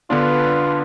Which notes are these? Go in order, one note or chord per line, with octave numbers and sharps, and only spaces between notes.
D3 B3 D4 F4 B4